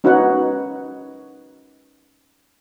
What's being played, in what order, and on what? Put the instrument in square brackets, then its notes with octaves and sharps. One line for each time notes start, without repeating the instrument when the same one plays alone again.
[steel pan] C#4 D#4 F#4 B4 C#5 F#5